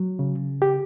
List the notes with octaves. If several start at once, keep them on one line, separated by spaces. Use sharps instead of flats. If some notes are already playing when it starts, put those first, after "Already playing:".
Already playing: F#3
C#3
G4